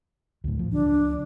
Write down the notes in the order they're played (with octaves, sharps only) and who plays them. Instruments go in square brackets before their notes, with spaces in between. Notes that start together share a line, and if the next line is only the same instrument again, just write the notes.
[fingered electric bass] D2 A2
F3
[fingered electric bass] C#2 F3 [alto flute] D4